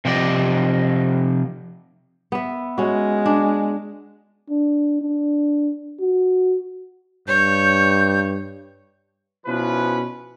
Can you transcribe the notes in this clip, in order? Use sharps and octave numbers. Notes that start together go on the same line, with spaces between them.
C3 F3 G4 D5 D#5
B3 E5
G#3 C#4 F#4
D4
D4
D4
F#4
G2 C#5 G6
B2 F3 C#4 E4 B4